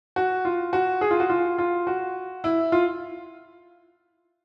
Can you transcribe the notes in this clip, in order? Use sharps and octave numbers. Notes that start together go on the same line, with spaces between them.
F#4
F4
F#4
G#4
F4
F#4
F4
F4
F#4
E4
F4